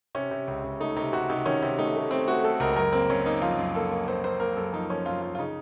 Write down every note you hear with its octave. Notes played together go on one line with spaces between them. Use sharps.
C3 C#4
C3
C#2
C#2
A3 D#4
C3 D#4
C3 F#4
C3 D#4
D#3 C#4
C3
A3 D#4
A3
A3 C4
A3 F#4
A3 A4
C#2 A#4
F#2 A#4
A#3 C4
F#2 C#4
A#3 D#4
F3 F4
F#2
A#3 A4
A#3
A#3 C5
A#3 C5
A#3 A#4
F#2 A4
F3 D#4
F3 C#4
F#2 F4
F#2 F4
F4
C#3 D#4